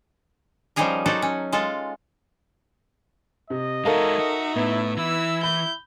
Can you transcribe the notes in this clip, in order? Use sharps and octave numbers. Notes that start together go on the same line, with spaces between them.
F3 G3 C#4 D#4 G#4 A#4
F#3 D#4 F#4 A4 C5 D5
C#4
G#3 F4 A4
C3 D#5
G#3 D#4 F#4 A4 A#4 E5 F5
F#4
A2 B3 E4
E3 E4 E6
B5 G6